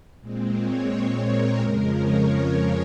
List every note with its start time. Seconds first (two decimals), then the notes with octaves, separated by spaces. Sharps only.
0.20 A#2 G#3 C4
0.55 C#5
0.91 C#5
1.25 A#4
1.60 F2 C#3 F3 G#3 A#4
1.95 C#5
2.30 C#5